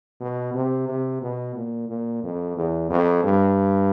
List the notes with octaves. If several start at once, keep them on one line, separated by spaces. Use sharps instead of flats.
B2
C3
C3
B2
A#2
A#2
F2
E2
F2
G2